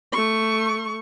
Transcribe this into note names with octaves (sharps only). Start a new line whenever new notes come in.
A3 C#6